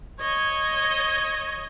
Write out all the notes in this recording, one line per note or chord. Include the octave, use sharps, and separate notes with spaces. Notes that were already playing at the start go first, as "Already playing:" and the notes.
C#5 D#5